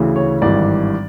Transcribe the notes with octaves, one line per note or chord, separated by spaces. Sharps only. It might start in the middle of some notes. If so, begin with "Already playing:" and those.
Already playing: D2 C#3 E3
C#5
G#1 G2 E3 D5